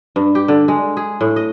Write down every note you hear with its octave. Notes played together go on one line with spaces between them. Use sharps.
G2
G4
D3
G#3
G#4
A2
D#5